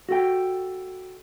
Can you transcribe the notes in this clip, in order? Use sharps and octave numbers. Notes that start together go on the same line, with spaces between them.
F#4 A4 G5